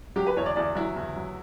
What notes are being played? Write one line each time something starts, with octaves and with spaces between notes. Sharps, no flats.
F#3 G4
B4
E2 C#5
D5
E2 D5
F#3 E4
E2
F#3